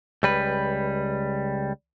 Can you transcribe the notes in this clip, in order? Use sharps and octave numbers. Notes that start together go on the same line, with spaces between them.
C#2 G3 B4